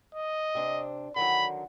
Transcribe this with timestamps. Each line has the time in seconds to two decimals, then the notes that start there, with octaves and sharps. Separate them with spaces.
0.15 D#5
0.55 C3 D4 C5
1.16 D3 D#3 F#3 B5